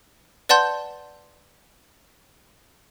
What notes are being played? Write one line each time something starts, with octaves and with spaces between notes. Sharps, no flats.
B4 D5 F#5 A5 C6 G6